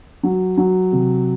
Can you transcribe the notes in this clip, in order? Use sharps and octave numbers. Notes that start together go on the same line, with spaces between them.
F#3
F#3
C3